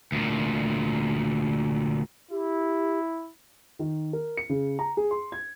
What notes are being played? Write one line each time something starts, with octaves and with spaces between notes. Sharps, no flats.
D2 A#2
E4 G4
D#3
A#4
C#7
C#3
A#5
G#4
C6
G#6